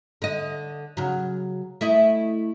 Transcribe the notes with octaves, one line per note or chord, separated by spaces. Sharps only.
D3 D#5
C#3 F#3
A3 E4 D#5